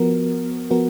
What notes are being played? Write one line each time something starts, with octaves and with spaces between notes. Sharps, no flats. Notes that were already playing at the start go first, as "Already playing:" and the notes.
Already playing: F3 B3 F#4 A#4
F3 B3 F#4 A#4